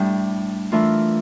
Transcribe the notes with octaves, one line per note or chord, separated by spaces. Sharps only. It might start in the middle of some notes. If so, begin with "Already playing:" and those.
Already playing: A2 G3 D4
E3 A3 D4 F4 A#4